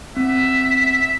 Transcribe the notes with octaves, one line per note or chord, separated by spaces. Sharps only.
C4 E5